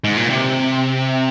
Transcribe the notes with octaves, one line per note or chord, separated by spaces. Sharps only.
G#2
A#2
C3